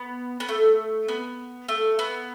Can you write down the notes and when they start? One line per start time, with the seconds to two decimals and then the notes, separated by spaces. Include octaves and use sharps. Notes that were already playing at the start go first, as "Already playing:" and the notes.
Already playing: B3
0.40 B3
0.49 A3
1.08 B3
1.69 A3
1.99 B3